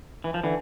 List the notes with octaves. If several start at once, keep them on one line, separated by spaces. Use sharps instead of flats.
E3
F3
D3 E3